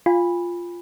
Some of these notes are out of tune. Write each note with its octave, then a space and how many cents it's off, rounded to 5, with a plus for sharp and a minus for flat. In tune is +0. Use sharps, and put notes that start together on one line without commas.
F4 +0 G#5 -35 B5 -5